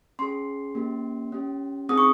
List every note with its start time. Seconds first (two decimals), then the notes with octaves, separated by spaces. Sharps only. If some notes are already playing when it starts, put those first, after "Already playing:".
0.19 C#4 G#4 C6
0.75 A#3 C#4 G4
1.32 C#4 G4
1.89 C4 D#4 G#4 D#6
1.98 C#6